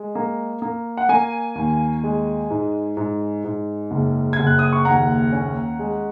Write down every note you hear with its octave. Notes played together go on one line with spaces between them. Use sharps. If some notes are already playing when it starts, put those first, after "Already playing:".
Already playing: G#3
A#3
A#3
F#5
A#3 G#5
D#2
G#3
G#2
G#2
G#2
F#1
G#6
F#1
F#6
D#6
C#6
D#2 F#5 A#5
C#4
G#3